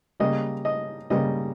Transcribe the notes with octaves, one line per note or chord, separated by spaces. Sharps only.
C#3 G3 A#3 D#5
D#5
C#3 G3 A#3 D#5